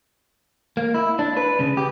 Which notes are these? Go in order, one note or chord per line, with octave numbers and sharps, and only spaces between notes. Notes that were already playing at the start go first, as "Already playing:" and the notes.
A#3
E4
D4
B4
C#3
G4